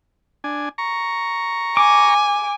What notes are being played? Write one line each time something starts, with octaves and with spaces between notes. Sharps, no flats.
D4 G#5
A#5 C#6
G#5 D6